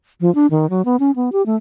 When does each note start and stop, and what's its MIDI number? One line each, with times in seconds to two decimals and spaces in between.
0.21 0.33 53
0.35 0.47 62
0.51 0.69 51
0.70 0.84 54
0.85 0.96 59
1.00 1.11 61
1.16 1.30 59
1.32 1.45 67
1.46 1.56 57